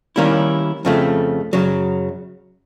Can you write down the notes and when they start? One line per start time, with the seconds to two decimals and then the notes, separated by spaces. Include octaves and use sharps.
0.16 D#3 G3 A#3 C#4 E4
0.85 F2 C#3 F3 A3
1.53 F#2 C#3 F#3